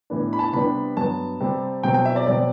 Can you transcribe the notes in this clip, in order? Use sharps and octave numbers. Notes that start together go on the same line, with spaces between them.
A2 E3 B3 D4
B5
A5
C3 G3 B3 D4 B5
G2 F#3 B3 A5
C3 G3 C4
B2 F#3 C4 G5
G5
E5
D5
B2 F#3 C4 D5